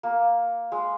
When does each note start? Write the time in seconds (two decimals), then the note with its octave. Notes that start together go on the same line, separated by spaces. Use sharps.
0.03 A#3
0.72 G#3